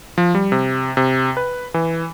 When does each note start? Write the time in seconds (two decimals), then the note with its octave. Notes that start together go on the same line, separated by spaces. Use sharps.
0.18 F3
0.35 G3
0.52 C3
0.97 C3
1.37 B4
1.74 E3